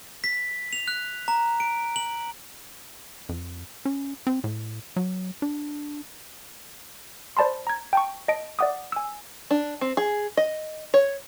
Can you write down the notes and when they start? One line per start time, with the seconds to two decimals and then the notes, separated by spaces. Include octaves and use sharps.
0.24 B6
0.73 F7
0.88 F#6
1.28 A#5
1.60 D7
1.96 F#7
3.29 F2
3.85 C#4
4.27 C4
4.44 A2
4.96 F#3
5.42 D4
7.37 C5 D5 A5 B5 C6
7.67 A#5 G#6
7.93 G5 A5 C#6
8.28 D#5 A5 D7
8.59 D5 E5 F#5 D6 D#6
8.92 G#5 E6
9.51 D4
9.81 C4
9.97 G#4
10.37 D#5
10.94 C#5